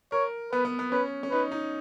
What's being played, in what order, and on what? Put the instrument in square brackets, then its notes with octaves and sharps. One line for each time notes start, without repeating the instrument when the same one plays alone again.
[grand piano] A#4 [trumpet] C#5
[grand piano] B3 [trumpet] B4
[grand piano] B3
B3
[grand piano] C#4 [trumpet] B4
[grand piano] C#4
[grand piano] D#4 [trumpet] B4
[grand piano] D#4